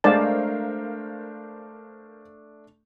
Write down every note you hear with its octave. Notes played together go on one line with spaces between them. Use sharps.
G#3 A3 D4 A#4 C5 D5 F5 A5